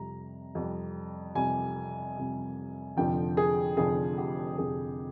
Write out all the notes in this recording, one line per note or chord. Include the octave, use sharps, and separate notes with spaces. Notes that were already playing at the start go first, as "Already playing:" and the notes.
Already playing: F2 C3 G3 A#5
F2 C3 G3
F2 C3 G3 G#5
F2 C3 G3
F1 F2 D3 F3 G5
G#4
F1 F2 D3 F3 G#4
G4
F1 F2 D3 F3 G#4